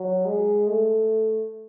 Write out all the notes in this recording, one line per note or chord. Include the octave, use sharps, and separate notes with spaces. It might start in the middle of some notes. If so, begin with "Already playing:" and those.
Already playing: F#3
G#3
A3